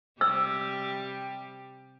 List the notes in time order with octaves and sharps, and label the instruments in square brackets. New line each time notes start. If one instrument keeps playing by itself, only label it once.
[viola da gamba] C3 G3 G4 [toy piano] E6